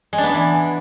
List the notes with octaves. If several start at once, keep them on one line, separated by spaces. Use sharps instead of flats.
G#3
D4
B3
D4
E3